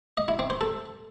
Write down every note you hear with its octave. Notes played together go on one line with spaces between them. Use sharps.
D#5
E4
C4
C5
A4